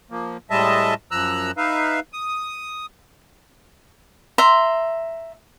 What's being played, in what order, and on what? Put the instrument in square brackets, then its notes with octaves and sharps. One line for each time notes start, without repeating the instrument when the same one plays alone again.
[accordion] F3 A#3
A2 G3 G#3 D#5 E5 A5
F#2 F3 A#5 E6 F#6
D#4 B4 E5 F5
D#6
[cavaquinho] E5 A#5 C6